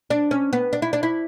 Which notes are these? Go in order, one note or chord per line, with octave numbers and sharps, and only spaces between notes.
D4
C#4
B3
D4
E4
D4
E4